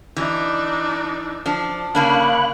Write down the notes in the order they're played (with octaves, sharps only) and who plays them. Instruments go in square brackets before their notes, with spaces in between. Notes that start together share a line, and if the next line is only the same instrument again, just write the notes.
[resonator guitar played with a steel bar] E3 [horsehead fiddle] D4 D#4
[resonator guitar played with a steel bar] F3 D4
[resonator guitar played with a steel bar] C#3 A#3 D4 [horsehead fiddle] C#5 [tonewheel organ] F5 B5 F#6